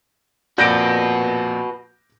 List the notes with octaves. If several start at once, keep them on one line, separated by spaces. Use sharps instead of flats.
F2 A#2 F#4 B4 D5 G6 A#6 D7